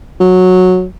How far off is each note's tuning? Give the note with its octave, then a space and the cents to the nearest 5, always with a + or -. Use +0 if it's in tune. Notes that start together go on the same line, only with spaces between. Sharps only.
F#3 -10